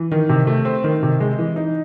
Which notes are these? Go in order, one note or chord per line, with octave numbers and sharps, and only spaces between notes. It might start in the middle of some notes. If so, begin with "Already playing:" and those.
Already playing: E3
D#3
C3
A3
C4
D#3
C3
G#3
E3
D#4